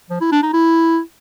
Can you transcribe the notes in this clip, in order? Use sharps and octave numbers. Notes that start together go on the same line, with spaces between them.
F3
E4
D4
D#4
E4